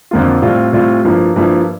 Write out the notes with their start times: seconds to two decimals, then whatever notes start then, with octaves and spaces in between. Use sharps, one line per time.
0.11 F2 D3 F3 A#3 F4
0.42 A2 G3 C4 F4
0.73 A2 G3 C4 F4
1.04 G2 F3 A#3 E4
1.36 G2 F3 A#3 E4